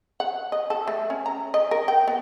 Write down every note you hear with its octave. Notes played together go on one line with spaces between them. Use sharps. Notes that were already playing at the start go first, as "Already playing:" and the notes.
F#5
D#5
A4
A3
C#4
A#5
D#5
A#4
G5
B3